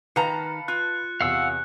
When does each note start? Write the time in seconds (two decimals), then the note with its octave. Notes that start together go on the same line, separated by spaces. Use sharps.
0.16 D#3 B4 F5 A5 A#5 C#7
0.68 F4 F#6
1.21 E2 C3 F5 F#5 E6